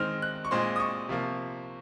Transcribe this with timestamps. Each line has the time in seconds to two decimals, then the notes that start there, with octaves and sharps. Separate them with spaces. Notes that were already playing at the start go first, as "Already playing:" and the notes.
Already playing: D#3 G#3 C4 F6
0.22 F#6
0.45 C#6
0.51 A#2 G#3 C4 C6
0.76 D#6
0.80 C#6
1.09 C3 F3 A#3